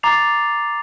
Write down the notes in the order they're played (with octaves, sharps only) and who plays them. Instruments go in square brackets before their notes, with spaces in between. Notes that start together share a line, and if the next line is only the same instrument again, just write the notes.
[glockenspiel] A#5 D6 A6 C7 F7